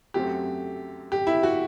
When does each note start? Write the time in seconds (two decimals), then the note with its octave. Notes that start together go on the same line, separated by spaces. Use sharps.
0.14 F#2 F#3 A3 C4 G4
1.12 G4
1.27 E4
1.43 F#4